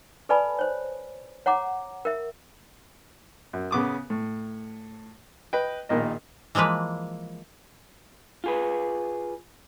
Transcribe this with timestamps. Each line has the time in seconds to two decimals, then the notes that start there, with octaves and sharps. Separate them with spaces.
0.29 A4 B4 D5 G#5 A5 B5
0.59 C5 C#5
1.46 C#5 F#5 A#5 D6
2.05 A#4 E5
3.53 F#2
3.71 C#3 B3 D6 D#6
4.10 A2
5.53 B4 D#5 G5
5.89 A#1 A#2 D#3 A#3 D#5
6.55 E3 F3 G#3 A#3 B4
8.44 F4 G#4 B4